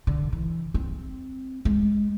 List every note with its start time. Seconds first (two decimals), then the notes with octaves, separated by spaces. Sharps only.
0.07 D3
0.32 E3
0.74 C4
1.65 G#3